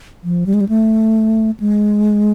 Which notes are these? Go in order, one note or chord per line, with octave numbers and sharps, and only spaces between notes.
F3
G3
G#3
G3
A3
G#3